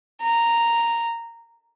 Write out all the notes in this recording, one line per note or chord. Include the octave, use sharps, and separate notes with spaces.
A#5